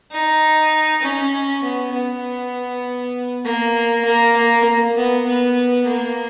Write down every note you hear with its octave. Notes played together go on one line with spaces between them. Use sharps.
D#4
C#4
B3
B3
A#3
A#3
A#3
B3
B3
A#3